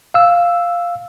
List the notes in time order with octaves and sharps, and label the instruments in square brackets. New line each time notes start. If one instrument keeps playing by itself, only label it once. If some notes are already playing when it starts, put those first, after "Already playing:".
[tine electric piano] F5 E6